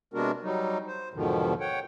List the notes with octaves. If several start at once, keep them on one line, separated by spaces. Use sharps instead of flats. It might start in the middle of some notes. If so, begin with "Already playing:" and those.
C3 G#3 B3 D4 F#4 A#4
F#3 G3 D#4
C5
E2 G#2 B2 D3 D#3 F3
C#5 F#5 G5